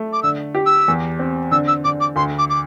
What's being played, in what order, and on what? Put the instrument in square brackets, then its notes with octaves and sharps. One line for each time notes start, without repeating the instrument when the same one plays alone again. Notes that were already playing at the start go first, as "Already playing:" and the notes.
Already playing: [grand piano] A3
[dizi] D6
[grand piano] D3 [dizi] E6
[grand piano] G4
[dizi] E6
[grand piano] E2
C4
[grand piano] D3 [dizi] E6
[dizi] E6
[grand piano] D3 [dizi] D6
[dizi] D6
[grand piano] D2 [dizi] C6
[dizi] D6
D6